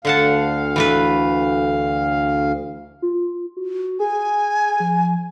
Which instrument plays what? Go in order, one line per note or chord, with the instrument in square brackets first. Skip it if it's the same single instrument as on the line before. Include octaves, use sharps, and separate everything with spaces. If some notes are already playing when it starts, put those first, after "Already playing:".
[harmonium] D2 F5 [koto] D3 F#5 A5
[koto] E3 A3 B4
[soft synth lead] F4
F#4
[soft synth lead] G#4 [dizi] G#5
[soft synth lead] F3